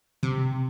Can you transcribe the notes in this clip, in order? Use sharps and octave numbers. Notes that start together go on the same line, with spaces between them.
C3